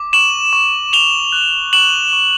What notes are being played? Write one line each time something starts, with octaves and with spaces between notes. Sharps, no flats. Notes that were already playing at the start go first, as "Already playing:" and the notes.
Already playing: D6
C#6 E7 F#7
C#6
D6 F7 G7
F#6
C#6 E7 F#7
C#6